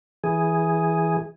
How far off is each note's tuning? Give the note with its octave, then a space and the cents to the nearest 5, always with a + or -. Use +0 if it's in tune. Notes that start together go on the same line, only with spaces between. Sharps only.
E3 +0 G#4 +0